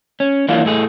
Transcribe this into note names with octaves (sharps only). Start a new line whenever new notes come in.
C#4
E3 F#3 A#3 D4 E4 F4
A2 A3 G#4